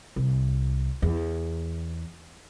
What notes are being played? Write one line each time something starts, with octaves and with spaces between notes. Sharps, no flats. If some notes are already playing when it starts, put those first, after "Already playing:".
C2
E2